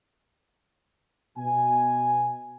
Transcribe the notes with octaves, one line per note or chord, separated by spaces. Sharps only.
B2 G#5